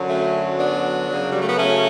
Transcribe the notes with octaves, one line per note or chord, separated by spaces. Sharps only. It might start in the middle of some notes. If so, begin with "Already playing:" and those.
Already playing: F#2 D3 F#3
A3 C#4
B3 D4
F#2 C#3 F#3
G3
A3
B3
A3 C#4